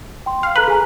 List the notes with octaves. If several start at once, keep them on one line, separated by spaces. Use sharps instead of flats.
G5 C6
F5
A4 B4 A#5 F#7
G#4 G#5 A#5